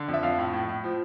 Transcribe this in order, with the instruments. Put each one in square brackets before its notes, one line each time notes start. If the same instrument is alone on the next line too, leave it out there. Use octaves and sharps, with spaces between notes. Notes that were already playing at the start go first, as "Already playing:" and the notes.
Already playing: [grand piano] D3
F2
E5
F2 F5
A2
A2
A2
F3